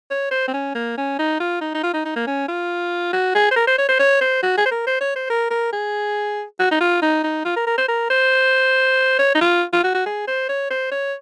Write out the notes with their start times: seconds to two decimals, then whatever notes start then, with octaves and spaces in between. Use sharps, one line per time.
0.10 C#5
0.31 C5
0.48 C4
0.54 C#4
0.75 A#3
0.97 C#4
1.19 D#4
1.40 F4
1.61 D#4
1.74 D#4
1.83 F4
1.94 D#4
2.05 D#4
2.16 A#3
2.27 C#4
2.48 F4
3.13 F#4
3.35 G#4
3.51 C5
3.56 A#4
3.67 C5
3.78 C#5
3.88 C5
3.99 C#5
4.21 C5
4.43 F#4
4.58 G#4
4.66 C5
4.71 A#4
4.87 C5
5.01 C#5
5.16 C5
5.30 A#4
5.50 A#4
5.73 G#4
6.60 F#4
6.71 D#4
6.81 F4
7.02 D#4
7.23 D#4
7.45 F4
7.56 A#4
7.67 A#4
7.78 C5
7.88 A#4
8.10 C5
9.19 C#5
9.35 D#4
9.41 F4
9.73 F4
9.84 F#4
9.94 F#4
10.06 G#4
10.27 C5
10.49 C#5
10.71 C5
10.91 C#5